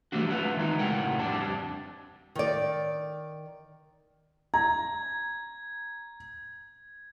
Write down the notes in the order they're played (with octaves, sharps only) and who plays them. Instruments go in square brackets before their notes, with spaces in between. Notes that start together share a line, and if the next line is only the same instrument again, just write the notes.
[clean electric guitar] E3 F3 G3 A3 D4 F#4
F4 B4 E5 F#5
D#3 E3 G#3 D#4
A2 C#3 A#4 F#5 G5
F2 G3 D4 D5 A5
[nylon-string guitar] D#3 D5
[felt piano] A#5 [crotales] G#6